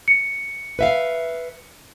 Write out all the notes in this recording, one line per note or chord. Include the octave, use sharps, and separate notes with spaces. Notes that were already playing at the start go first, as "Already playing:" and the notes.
C#7
B4 E5 F5